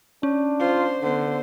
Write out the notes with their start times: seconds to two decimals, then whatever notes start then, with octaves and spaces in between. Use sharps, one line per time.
0.23 C#4 D4
0.60 F4 C5
1.02 D3 B3 C5